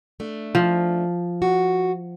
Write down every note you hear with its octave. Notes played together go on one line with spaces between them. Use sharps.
A3 D4
F3
F#4